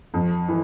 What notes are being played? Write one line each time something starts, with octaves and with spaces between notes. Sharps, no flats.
F2
E3